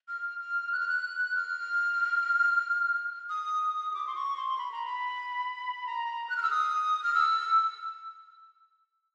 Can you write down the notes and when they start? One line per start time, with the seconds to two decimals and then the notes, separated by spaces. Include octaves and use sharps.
0.08 F6
0.40 F6
0.72 F#6
0.79 F6
0.88 F#6
1.36 F6
3.29 D#6
3.94 D6
4.07 C6
4.15 C#6
4.37 C6
4.58 B5
4.72 A#5
4.85 B5
5.86 A#5
6.30 F#6
6.37 F6
6.43 E6
6.51 D#6
7.03 F6
7.14 E6